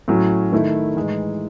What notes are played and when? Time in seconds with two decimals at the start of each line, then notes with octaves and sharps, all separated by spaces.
0.08 A2 F#3 C#4
0.52 D#3 A3 E4
0.96 A2 E3 G#3 D#4